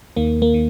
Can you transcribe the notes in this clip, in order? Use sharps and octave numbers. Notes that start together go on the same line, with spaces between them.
D#2 D#3 A#3
A#3
D#3